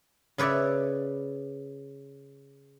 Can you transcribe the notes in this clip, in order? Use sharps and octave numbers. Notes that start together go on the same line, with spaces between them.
C#3 B4 C#5 D5 E5